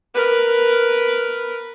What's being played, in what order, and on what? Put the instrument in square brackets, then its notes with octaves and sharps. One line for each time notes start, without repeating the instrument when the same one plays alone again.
[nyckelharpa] A#4 B4